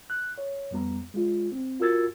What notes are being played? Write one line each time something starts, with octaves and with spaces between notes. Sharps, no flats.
F#6
C#5
F2 G3 B3 A#5
G#3 F4
C4
F4 F#4 A#4 E6 G#6 A6